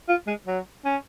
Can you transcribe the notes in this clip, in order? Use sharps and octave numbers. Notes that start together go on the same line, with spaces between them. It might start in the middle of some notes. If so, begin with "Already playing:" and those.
F4
G#3
F#3
C#4